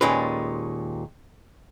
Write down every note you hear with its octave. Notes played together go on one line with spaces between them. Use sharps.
D#2 A#2 G#3 C#4 B4